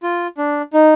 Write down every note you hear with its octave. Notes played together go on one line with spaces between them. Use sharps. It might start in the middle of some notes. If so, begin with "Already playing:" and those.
F4
D4
D#4